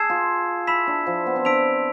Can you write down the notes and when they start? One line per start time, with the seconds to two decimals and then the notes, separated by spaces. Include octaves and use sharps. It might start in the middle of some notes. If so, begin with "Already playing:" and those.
Already playing: G#4 A5 E6 G#6 C7 E7
0.10 F4
0.67 E4 B5 E6 B6 E7
0.87 D4
1.07 F3
1.26 B3
1.36 C4
1.45 D4 E6 B6 D7 F7